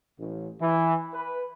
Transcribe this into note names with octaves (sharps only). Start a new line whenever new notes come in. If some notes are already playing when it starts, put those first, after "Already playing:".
A1
E3
B4